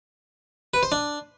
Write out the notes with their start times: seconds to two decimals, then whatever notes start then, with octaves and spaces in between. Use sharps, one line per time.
0.74 B4
0.83 C5
0.92 D4